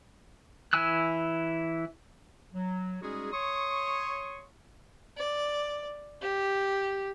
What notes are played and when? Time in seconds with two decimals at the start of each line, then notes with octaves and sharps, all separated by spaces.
0.73 E3 E4 G#5 E6 F#6
2.53 F#3
3.02 G3 G#3 C#4 D#4 F#4 G#4
3.32 C#5 C6 C#6 D#6
5.18 D5
6.22 G4